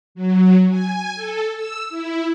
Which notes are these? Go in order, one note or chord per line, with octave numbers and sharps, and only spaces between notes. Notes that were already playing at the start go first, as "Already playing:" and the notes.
F#3
G#5
A4
E6
E4